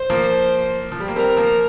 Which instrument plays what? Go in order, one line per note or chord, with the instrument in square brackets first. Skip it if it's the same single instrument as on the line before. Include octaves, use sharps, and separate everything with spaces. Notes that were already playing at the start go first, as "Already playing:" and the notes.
Already playing: [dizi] C5
[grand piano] F3 A#3
F3
G3
A#3
[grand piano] G3 C4 [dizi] A#4
[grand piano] F3 A#3